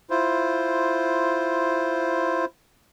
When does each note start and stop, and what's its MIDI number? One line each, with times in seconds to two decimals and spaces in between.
0.10 2.45 64
0.10 2.45 65
0.10 2.45 72